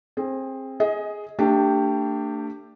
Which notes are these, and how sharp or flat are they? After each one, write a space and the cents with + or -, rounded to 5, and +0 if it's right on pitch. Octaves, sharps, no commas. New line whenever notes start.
C4 +20 G#4 +0
G#4 +0 D#5 +20
A3 +35 D4 +0 G4 +0